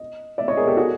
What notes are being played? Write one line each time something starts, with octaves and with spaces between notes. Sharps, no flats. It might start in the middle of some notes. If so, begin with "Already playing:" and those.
Already playing: D#5
D5 E5
C#5 D#5
G#4 A#4
G4 A4
F#4 G#4